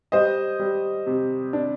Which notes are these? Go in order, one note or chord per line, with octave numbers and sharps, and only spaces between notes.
G3 C5 D#5
G3
C3
D4